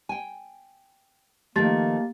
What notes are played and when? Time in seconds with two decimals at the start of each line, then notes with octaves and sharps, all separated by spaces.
0.09 G5 G#5
1.56 D#3 F3 A3 A#3 G4 A6